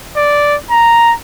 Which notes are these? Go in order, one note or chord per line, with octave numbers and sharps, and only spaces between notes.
D5
A#5